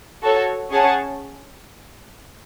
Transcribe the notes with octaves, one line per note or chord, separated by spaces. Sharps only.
F#4 A4 C#5
C#4 G#4 C#5 F#5 A5